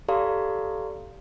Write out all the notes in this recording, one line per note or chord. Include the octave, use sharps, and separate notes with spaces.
G4 A4 D5 F5 A#5 C6